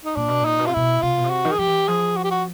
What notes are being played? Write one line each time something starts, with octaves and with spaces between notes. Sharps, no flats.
D#4
A#2 D4
B2
A#2 D#4
B2
C3 F4
B2 E4
C3 F4
B2
C3
F#4
D#3
G#4
F3 G4
E3
F3 G#4
F#4
G4
F#4